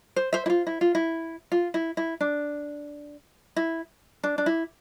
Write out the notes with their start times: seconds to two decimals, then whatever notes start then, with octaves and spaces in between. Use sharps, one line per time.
0.16 C5
0.33 C5 E5
0.46 E4
0.50 F4
0.67 E4
0.81 F4
0.95 E4
1.52 F4
1.74 E4
1.97 E4
2.21 D4
3.56 E4
4.23 D4
4.38 D4
4.46 E4